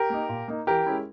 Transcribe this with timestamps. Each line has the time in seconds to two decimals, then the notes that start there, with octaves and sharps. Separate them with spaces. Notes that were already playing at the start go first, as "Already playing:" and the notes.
Already playing: G4 A#4
0.10 A#3 D#4
0.29 A#2
0.48 A#3 D#4
0.67 E3 G4 A#4
0.87 G#3 C#4 E4